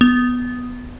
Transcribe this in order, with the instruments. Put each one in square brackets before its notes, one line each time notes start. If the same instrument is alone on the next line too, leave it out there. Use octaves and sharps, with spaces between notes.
[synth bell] B3